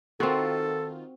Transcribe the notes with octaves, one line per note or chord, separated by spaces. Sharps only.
D#3 C4 F4 F#4 A4